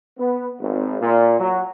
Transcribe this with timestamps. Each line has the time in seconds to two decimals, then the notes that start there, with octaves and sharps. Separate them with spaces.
0.18 B3
0.60 G#1
1.01 A#2
1.39 F#3